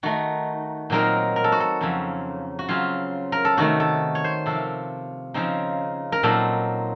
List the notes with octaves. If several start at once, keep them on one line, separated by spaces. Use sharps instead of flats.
D#3 A3 D#4 F#4
A#2 F#3 C4 D#4 A#4
A#4
A4
F#4
A4
F2 C#3 F#3 C4
F#4
C#3 F#3 C4 F4
A#4
A4
C3 D#3 A3 F#4
A4
C#5
C5
C3 F3 C4 F4 A4
C#3 F3 C4 D#4
A#4
A#2 F#3 C4 D#4 A4